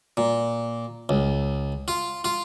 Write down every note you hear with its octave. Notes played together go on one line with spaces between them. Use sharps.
A#2
C#2
F4
F4